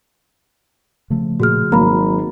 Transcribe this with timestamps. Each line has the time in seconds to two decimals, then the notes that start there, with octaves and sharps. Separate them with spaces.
1.10 C#3 F3 A3
1.40 A#2 F#4 G#4 F6
1.72 G#1 F#3 A#3 A#5 B5